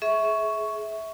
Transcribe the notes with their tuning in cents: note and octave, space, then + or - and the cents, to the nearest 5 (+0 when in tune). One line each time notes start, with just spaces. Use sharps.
G#4 +25 E5 -20 C#6 +5